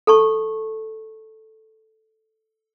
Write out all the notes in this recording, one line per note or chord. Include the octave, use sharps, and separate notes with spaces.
A4 A5 C#6